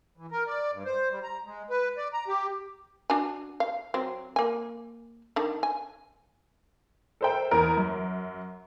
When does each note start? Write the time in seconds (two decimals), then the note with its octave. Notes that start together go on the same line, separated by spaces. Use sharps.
0.17 E3
0.31 A#4
0.47 D5
0.73 G2
0.85 C5
1.11 G3
1.23 A#5
1.46 G#3
1.70 B4
1.97 D5
2.13 A#5
2.28 G4
3.10 D4 F#4 G#5
3.60 F5
3.94 F#3 C4
4.36 A#3 G#5
5.36 D3 D#3 A5
5.63 G#5
7.21 A4 A#4 C5 E5 G5
7.51 E2 A#4
7.77 F#2